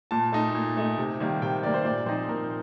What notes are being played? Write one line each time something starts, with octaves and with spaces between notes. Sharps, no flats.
A#2 A5
A3 D#4 A5
A#2
A3 D#4
C3
D#3 G3 A#3
C3 G5
D#3 G3 A#3 D5
C5
A#2 D5
F3 C4 D#4 C5
A#2 A#4